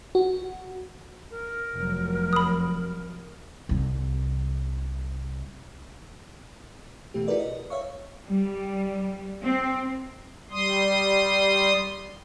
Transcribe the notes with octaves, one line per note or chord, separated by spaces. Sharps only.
F#4
A#4
F1 F#3
B5 D#6
C2 C3
B2 E3 A3 G4
E4 F#4 G#4 A#4 B4 D5
D#5
C#5 E5 F5 C#6
G3
C4
G3 C6 D#6